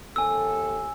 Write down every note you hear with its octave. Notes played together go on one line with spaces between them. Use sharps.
D#2 G4 A4 G#5 E6